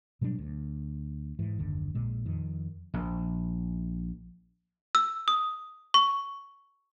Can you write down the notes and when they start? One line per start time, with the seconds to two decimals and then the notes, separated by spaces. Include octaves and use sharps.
0.21 B2 F#3 G3 D4
0.38 D2
1.39 G#2 E3
1.59 F#1 D#2 D3
1.95 A#1 A#2 G#3
2.26 F2 D#3
2.94 A#1
4.95 E6
5.28 D#6
5.94 C#6